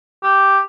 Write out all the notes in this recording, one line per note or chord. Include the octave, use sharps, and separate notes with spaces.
G4